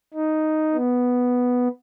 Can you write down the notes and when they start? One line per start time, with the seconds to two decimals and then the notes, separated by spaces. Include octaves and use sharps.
0.14 D#4
0.74 B3